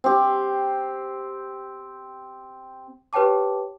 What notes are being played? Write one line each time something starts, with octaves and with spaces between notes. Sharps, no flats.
C4 G4
G4 B4 C#5 G5 A5 D6